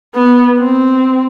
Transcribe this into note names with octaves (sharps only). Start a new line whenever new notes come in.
B3
C4